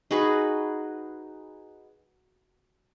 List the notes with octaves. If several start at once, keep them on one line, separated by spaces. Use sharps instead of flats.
D#4 F#4 G#4 B4